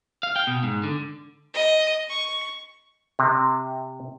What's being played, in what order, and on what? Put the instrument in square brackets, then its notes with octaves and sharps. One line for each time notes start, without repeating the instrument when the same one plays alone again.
[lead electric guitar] F5
G5
B2
G#2
D3
[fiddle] D#5
C#6
[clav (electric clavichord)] C3